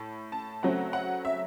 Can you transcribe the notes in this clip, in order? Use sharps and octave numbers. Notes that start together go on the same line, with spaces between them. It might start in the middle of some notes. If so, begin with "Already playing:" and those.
Already playing: A2 A5
A5
C#3 F#3 A3 C4 F#5
F#5
E5